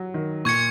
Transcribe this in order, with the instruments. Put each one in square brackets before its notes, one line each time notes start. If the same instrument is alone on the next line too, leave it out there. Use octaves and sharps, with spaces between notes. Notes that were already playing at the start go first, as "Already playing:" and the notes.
Already playing: [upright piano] F#3
D#3
[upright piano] A#2 [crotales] C#6 G#6 C#7